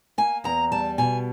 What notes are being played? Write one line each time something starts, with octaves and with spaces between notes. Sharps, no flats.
A#3 G#5
E2 A#5
G3 A5
B2 G#5